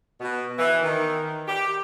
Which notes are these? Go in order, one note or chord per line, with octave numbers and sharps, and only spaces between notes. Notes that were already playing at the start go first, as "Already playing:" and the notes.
B2
E3
D#3
G4